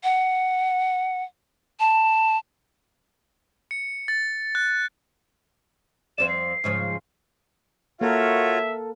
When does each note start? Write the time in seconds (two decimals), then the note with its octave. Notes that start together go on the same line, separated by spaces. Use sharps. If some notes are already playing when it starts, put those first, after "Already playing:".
0.03 F#5
1.80 A5
3.71 C#7
4.08 A6
4.55 F#6
6.18 F2 C4 D5 E7
6.29 C7
6.64 G#2 C#3 F3
8.01 A#3 F4 F#4 A4 A#4 C#5 E5